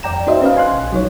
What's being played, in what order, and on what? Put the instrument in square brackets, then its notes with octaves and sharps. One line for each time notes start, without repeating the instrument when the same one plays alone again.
[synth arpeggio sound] F2 D5 G5 A#5 E7
D#4 F#4 C5 D#5 E5
C#4 B4 D#5 F5
G#5 C6 F#6
A#1
F#3 D#4 C#5